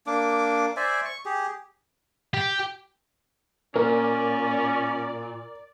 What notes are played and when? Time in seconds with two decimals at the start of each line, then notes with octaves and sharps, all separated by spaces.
0.07 A#3 D4 D6
0.77 C5 D5 E5 G#5
1.05 C#6
1.26 G4 G#4
2.34 G4
3.76 A#2 C#4 A#4 D5